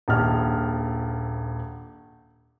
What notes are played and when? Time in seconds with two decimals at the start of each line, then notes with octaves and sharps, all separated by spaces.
0.08 D#1 A#1 F6